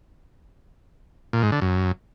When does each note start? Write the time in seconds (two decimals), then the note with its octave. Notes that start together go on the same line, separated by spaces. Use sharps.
1.33 A#2
1.43 G#2
1.52 D3
1.62 F#2